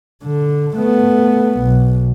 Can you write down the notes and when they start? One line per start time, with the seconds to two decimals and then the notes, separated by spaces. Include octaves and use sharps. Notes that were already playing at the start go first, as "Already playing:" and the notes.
0.23 D3
0.77 A3 B3
1.60 B1